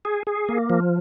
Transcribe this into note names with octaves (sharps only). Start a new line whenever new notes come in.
G#4
G#4
A#3
F3